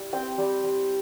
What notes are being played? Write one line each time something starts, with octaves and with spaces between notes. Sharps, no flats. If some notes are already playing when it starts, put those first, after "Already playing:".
Already playing: G3 E4
C4 G5
G3
G3